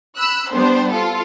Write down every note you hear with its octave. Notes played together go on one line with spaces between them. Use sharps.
B5 E6 F#6
G3 B3 C4 D4 C5
F4 A4